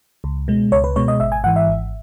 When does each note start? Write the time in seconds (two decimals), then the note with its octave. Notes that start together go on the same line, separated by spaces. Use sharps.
0.24 C#2
0.48 B2 G#3
0.72 C#2 C#5
0.84 B4
0.96 B2 G#3 C#5
1.08 D#5
1.20 G#1 E5
1.32 G#5
1.44 G#2 E3 F#5
1.56 E5
1.68 G#1